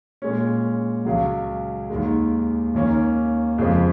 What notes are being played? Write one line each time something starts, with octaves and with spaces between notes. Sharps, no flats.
A#2 G#3 C#4
C#2 C#3 F#3
D#2 D#3 G#3
D#2 D#3 A#3 C#4
F2 C#3 F3 G#3